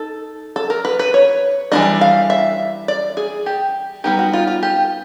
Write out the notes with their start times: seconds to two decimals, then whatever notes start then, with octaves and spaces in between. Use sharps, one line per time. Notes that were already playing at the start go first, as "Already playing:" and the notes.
Already playing: D#4 A4
0.56 A4
0.70 A#4
0.85 B4
0.99 B4
1.14 C#5
1.72 E3 G3 A#3 D4 D#5
2.01 F5
2.30 E5
2.88 D5
3.17 G#4
3.46 G4
4.04 G3 B3 D#4 G4
4.19 F#4
4.34 F4
4.47 F4
4.63 G4